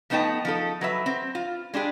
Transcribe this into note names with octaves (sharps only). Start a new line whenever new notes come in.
F3 A3 B3 D#4 G5 A5
F3 D#4 A4
F#3 B4 E5
C4
F4
G#3 D4 G4 G#4